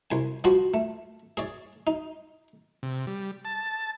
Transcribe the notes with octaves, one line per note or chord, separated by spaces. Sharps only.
C2 G#5
F3 G3 F#4 G4
A3
G#4 C#5 D5
D#4
C3
G3
A5